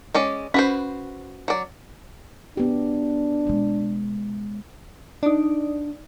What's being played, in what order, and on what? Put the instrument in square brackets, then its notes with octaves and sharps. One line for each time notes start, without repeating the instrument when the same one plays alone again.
[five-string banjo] G#3 C#4 D5
[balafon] C#4 [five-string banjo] F#4 B4 C5
[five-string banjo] F#3 D5
[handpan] B3 G4 [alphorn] D4
[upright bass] B2 G#3
[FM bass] D4 [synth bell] D#4 D5